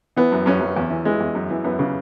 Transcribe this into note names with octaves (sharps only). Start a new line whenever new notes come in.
E3 B3
F#2
F#2 C#4
F#2
E2
E3
E3 G#3
E2
F#2
E3
F#2 B3
C#3